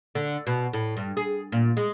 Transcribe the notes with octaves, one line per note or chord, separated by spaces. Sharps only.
D3
B2
A2
G2
G#4
A#2
G#3